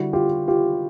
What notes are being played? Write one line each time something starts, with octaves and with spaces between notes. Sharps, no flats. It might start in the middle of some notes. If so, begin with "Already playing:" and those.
Already playing: D3 G3 E4 F#4
F4 G4
F4 G4